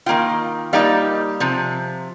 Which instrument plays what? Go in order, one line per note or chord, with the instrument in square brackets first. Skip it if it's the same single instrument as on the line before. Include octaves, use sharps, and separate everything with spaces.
[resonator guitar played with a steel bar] D#3 A#3 F4 G5
G3 A#3 D#4 F5
C3 F3